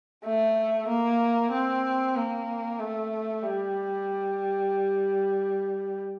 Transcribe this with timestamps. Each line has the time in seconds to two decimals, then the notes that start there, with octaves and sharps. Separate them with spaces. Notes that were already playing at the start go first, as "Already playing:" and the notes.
0.25 A3
0.89 A#3
1.52 C4
2.16 A#3
2.79 A3
3.43 G3